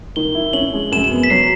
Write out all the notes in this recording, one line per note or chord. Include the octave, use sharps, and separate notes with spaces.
D#3 G7
E4
C#4 F#7
G#3
F#2 E7
E7
B3
B6
F#3 C7